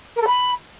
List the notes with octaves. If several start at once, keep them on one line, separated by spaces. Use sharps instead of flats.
A#4
A4
B5